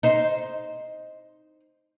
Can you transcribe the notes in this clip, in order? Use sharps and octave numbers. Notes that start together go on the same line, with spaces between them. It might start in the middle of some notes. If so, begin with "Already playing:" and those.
D#4 C5